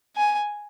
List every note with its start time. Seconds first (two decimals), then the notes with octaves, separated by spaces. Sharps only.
0.16 G#5